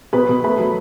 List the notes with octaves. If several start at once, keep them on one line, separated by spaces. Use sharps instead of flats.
B2 B4 B5
B2
A3 B4 B5
F#3